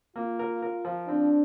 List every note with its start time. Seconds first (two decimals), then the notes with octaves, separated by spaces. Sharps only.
0.16 A#3 F4
0.39 A#4
0.62 A#4
0.85 F3
1.08 C4 D4